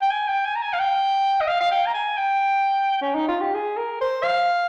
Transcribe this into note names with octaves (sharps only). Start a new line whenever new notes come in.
G5
G#5
G5
G#5
A#5
G#5
F5
G5
D#5
F5
F5
G5
A#5
G#5
G5
C#4
D#4
F4
G4
G#4
A#4
C5
F5